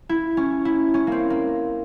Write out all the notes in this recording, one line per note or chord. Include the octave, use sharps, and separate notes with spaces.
E4
C#4
E4
C#4
A#3 C4
A#3